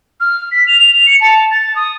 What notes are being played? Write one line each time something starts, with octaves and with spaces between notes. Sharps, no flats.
F6
B6
F7
C#7
A5
A6
D#6